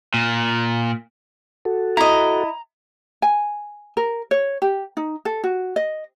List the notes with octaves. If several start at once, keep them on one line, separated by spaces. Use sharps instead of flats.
A#2
F#4 A4
E4 D#5 A#5
G#5
A#4
C#5
G4
D#4
A4
F#4
D#5